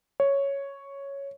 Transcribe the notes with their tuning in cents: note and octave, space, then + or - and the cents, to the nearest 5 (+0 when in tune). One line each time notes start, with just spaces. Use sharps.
C#5 +0